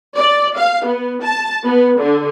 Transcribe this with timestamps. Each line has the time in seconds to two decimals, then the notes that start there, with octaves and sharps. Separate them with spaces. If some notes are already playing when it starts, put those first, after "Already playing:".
0.17 D5
0.57 F5
0.87 B3
1.23 A5
1.65 B3
1.99 D3